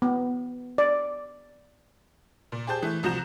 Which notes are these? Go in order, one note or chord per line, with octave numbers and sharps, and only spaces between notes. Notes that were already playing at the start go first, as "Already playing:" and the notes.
B3
D5
A#2
G4 G#4 C5 A5 G6
E3 A3
C2 F3 F#4 A#5 G6 E7